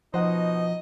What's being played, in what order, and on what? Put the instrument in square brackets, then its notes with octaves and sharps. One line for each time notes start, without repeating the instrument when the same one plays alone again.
[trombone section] B2 D#4 [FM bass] F3 [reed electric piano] C5 F#5 [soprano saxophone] D#5